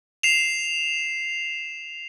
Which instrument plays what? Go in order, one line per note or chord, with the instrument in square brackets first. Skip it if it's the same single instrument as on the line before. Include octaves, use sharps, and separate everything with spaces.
[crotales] C7 E7 F7